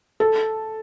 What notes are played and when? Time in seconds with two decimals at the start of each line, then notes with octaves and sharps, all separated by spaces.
0.20 A4